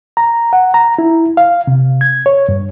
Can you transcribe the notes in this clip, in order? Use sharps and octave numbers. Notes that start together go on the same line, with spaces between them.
A#5
F#5
A#5
E4
F5
C3
G#6
C#5
G2